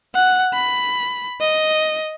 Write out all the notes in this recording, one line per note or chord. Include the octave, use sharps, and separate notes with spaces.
F#5
B5
D#5